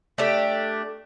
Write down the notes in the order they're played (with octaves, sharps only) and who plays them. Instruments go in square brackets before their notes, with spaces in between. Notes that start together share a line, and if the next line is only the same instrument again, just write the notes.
[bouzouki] A3 D4 G4